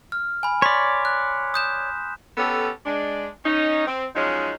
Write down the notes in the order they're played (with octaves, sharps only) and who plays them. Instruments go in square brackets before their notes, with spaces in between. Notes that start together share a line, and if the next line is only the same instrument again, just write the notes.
[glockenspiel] F6
G#5 B5
[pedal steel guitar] C#5 D5 [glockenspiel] C6 B6
[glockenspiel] F#6
D#6 G6 E7
[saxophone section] B3 C#4 G4 A4
G#3 D4
C#4 D#4
C4
F3 F#3 G#3 C#4 D#4